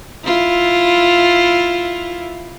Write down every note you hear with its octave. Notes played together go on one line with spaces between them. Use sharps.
E4 F4